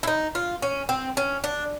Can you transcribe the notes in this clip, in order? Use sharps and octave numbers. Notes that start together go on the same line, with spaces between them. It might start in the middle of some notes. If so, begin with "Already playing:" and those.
E4
D#4
F4
C#4
C4
C#4
D4